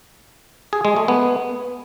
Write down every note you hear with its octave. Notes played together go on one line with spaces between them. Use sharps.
G#4
G#3
A3
B3